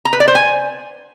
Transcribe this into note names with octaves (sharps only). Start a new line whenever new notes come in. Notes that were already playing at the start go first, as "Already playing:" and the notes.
A#5
B4
D5
C5
G#5